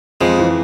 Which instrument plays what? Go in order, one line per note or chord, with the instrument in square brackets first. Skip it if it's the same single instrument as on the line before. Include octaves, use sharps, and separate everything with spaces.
[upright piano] F2 [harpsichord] F3 G#3
[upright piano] E3